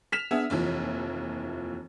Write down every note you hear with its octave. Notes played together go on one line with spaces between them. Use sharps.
F6 B6 E7 F7
B3 D4 G#4 E5
F1 D#2 E3 F3